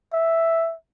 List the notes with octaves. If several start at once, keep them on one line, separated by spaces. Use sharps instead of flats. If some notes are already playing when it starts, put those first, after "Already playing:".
E5